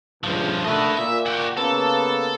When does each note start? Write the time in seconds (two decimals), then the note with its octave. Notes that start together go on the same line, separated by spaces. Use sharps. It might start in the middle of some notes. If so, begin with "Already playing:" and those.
0.24 C#2 G2 F3
0.65 D3 D#3 A3 B4 D#5
0.97 A#2 E5
1.26 F#4 G4
1.57 C#3 A#3 B3 A4